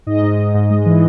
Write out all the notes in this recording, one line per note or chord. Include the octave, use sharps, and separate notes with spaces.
G#2 D#5
G#2
G#2
G#2
G#3
E3